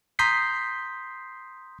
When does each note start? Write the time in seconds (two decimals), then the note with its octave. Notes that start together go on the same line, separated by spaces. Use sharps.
0.19 A#5 C6 D#6 G6 B6 C7